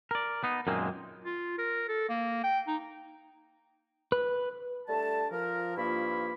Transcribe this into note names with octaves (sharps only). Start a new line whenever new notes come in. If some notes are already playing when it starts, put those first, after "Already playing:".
A#4 D5
B3 D#4
F#2 A#2 D#3 G#3 A#3 C4
F4
A#4
A4
A#3
G5
D#4
B4
G3 A3 D4 A5
F3 A#4
G2 F3 A#3 E4 B5